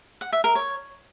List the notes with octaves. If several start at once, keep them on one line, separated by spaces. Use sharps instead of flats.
F#5
E5
A#4
C#5